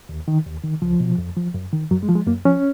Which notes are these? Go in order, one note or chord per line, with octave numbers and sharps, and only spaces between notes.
D#2
D#3
D#2
D#3
C#2 F3
B2
F2
F3
F#2
D#3
F#2 F#3
G#3
F3
G#3
F#2 A#3
F3 C#4